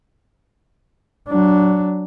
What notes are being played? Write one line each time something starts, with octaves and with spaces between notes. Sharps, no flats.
F#3 D4